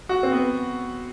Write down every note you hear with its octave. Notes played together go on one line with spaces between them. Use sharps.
F#4
C4
B3